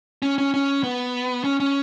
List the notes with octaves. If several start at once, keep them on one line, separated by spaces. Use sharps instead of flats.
C#4
C#4
C#4
B3
C#4
C#4